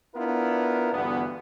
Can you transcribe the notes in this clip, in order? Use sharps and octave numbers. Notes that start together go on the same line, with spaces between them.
B3 D4 E4 F4 A#4
D2 G2 E3 B3